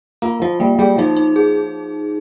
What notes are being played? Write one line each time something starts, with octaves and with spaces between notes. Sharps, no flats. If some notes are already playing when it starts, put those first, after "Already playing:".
A#3 F4
F3 F4
G3 A#3
G3 G#4
F3 D#4
D#4
G#4